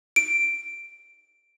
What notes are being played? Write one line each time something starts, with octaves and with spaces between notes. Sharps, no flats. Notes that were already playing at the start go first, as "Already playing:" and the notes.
D7